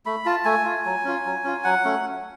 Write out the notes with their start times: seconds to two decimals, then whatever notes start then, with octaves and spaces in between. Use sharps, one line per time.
0.06 A3 B5
0.26 F4 A5
0.45 A3 G#5
0.65 F4
0.85 F#3
1.05 C#4 F4
1.25 F#3
1.44 C#4 F4
1.64 F#3 F#5
1.84 A3 C#4